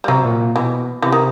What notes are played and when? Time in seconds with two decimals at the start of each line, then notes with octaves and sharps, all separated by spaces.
0.04 G3
0.08 C3 F#3
0.25 A#2
0.40 A#2
0.56 B2 E3
1.02 C3 E3
1.12 D#3